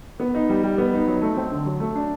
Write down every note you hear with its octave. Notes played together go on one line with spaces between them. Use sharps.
B3
D#4
G3
G3
B3
D#4
F#3
A3
C4
D3
F#3
A3
D4